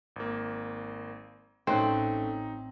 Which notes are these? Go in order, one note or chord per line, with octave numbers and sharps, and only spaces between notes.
G#1 A#3
A1 A3 C4 C#4 D#4 F#6